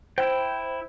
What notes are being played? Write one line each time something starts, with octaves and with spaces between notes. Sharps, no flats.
E4 C5 G5